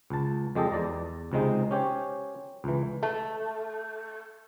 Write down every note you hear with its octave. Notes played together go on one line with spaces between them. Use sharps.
C#2 A5
F2 G#3 G4 A4 D#5
E2 D5 A#5
C#2 C3 G#3 D#4
C#4 G4 C5 C#5
C#2 E3
A3